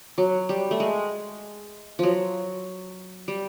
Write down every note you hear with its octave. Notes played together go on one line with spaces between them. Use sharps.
F#3
G3
A3
G#3
F3 F#3
G3